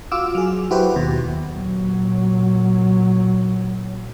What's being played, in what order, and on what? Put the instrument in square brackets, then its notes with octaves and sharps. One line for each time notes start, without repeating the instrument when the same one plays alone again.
[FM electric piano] F4 F#4 D6 E6 F6
F#3 G#4
F#3 E4 F#4 G4 B4 C5
D#2 B2
[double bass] A#2 F#3